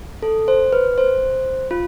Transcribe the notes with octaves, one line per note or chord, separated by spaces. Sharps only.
A4
C5
B4
C5
F4